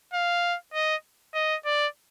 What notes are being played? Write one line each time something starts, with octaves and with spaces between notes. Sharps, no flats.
F5
D#5
D#5
D5